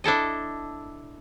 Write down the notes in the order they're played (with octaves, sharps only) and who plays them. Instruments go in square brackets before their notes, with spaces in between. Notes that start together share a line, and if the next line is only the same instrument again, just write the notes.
[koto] D4 E4 A4 D#5